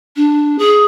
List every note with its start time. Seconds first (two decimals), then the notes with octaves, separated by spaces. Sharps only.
0.16 D4
0.58 G#4